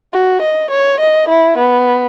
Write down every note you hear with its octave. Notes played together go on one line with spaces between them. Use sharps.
F#4
D#5
C#5
D#5
E4
B3